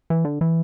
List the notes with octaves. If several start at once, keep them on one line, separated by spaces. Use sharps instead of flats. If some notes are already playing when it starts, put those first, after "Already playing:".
E3
D3
E3